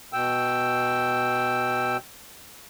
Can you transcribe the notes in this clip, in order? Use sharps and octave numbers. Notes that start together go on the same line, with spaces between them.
B2 G5 E6